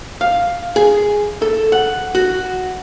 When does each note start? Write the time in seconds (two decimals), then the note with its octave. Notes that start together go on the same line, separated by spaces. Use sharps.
0.21 F5
0.76 G#4
1.42 A4
1.72 F#5
2.15 F#4